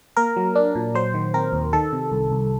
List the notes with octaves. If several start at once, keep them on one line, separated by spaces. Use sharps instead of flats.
A#3 A#4
F#3
D4
A#2
F#3 C5
D#3
C4 A#4
D#2
D#3 A4
C3
C2
C2